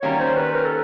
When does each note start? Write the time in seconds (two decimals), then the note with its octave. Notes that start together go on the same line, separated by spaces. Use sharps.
0.02 D#3 G3 A#3 C#4 F#4 C#5
0.20 C5
0.37 B4
0.55 A#4
0.66 A4